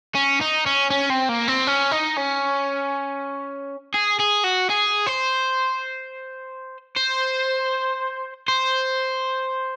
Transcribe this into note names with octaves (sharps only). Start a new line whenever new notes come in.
C#4
D#4
C#4
C#4
C4
A#3
C4
C#4
D#4
C#4
G#4
G#4
F#4
G#4
C5
C5
C5